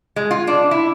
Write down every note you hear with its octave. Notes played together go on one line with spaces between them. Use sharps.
G#3
F4
D4
E4